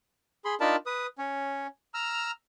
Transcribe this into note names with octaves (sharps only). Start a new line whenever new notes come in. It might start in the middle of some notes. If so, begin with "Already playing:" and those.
G#4 B5 C6
D4 D#4 F4 A#4 A5 B5
B4 D#6
C#4 C#5
A#5 E6 F6